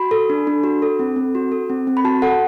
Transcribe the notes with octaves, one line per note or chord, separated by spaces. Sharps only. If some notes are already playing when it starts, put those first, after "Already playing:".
Already playing: F#4 B5
A4
D4
D4
F#4
A4
C4
C4
F#4
A4
C4
C4
B5
F#4 A5
A4 F#5